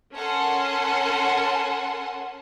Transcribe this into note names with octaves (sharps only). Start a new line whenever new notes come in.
C#4 A4 A#4 F#5 G#5 C6